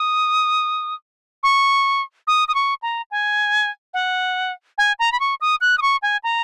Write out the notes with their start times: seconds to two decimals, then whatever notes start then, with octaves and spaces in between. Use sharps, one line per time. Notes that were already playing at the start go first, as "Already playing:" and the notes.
Already playing: D#6
1.43 C#6
2.27 D#6
2.48 D#6
2.55 C#6
2.82 A#5
3.11 G#5
3.94 F#5
4.78 G#5
4.99 A#5
5.12 B5
5.20 C#6
5.41 D#6
5.61 F#6
5.78 D#6
5.82 C#6
6.02 G#5
6.24 A#5